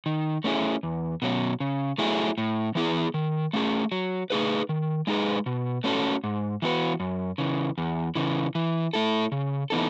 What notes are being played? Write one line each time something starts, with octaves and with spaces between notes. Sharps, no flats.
D#3
A3 C#4 E4 G#4
E2
B2 F#3 C#4
C#3
F#3 A3 E4 G#4
A2
E3 B3 E4 G#4
D#3
A3 C#4 G#4
F#3
A3 D#4 G#4 B4
D#3
G#3 D#4 G#4 B4
B2
A3 C#4 F#4 A4
G#2
E3 B3 F#4 B4
F#2
C#3 E3
E2
C#3 E3
E3
A3 E4 A4
C#3
E3 B3 D#4 A4